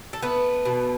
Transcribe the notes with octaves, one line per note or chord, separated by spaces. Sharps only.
A4
A3 B3 B4
B2